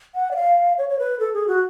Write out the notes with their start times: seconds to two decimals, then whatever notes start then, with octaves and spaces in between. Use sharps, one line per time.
0.15 F#5
0.31 D5
0.36 F5
0.78 C#5
0.89 C#5
0.99 B4
1.19 A4
1.34 G#4
1.47 F#4